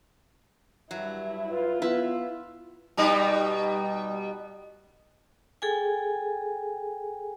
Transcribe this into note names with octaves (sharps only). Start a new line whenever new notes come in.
G2 F#3 E4
F4 B4
B3 E4 B4 E5
B2 G3 D#4
G#4 A4 G5 G#5